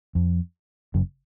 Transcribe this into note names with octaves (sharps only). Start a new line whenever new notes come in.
F2
F#1 F#2